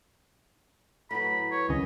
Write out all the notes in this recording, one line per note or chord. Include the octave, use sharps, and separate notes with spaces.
A2 F#3 B4 F#5 A#5 B5
B4 C#5
C#2 C#3 F#3 G3 C#4 A#4 D#5